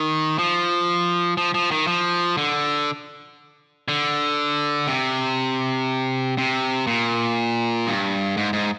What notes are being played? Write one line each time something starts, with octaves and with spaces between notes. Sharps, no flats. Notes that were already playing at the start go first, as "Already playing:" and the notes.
Already playing: D#3
F3
F3
F3
D#3
F3
D3
D3
C3
C3
A#2
G2
G#2
G#2